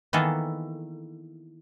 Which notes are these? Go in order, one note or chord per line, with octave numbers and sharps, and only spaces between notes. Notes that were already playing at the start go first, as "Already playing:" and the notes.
D#3 E3 A#3 B3 G#4 A4